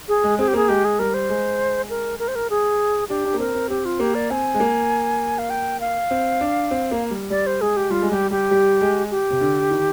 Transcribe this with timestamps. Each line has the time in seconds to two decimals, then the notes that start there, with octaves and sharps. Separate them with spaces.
0.08 G#4
0.24 G#3
0.39 C4 G#4
0.48 G4
0.54 A#3 G#4
0.68 G#3 G4
0.85 G#4
0.99 G3 A#4
1.14 C5
1.29 G#3
1.90 A#4
2.19 A#4
2.28 C5
2.35 A#4
2.50 G#4
3.09 D4 G4
3.25 D4
3.34 A#3
3.39 C4 A#4
3.55 C4
3.69 C4 G4
3.85 F4
4.00 A#3 G4
4.15 D5
4.30 C4 G#5
4.54 G#3
4.60 A#3
5.39 F5
5.50 G5
5.80 F5
6.11 C4
6.41 D4
6.71 C4
6.91 A#3
7.11 G3
7.30 G3 D5
7.47 C5
7.61 G#3 G#4
7.77 G4
7.91 G3 F4
8.02 G#3
8.11 G3 G4
8.31 G3 G4
8.51 G3
8.81 G#3
9.11 G4
9.30 C3
9.41 D3
9.60 D3
9.71 D#3